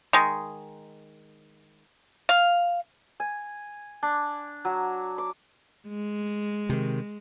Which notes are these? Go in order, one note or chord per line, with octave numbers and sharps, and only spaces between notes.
D#3 G#3
F5
G#5
D4
F#3
D6
G#3
C3 D#3